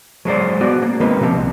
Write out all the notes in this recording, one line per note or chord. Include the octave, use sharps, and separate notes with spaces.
F#3 G#3 C5 D5
B3 F#4 D5
A#3
D#3 G#3 A#3 C4 B4
B2 F3 C4 G4
C2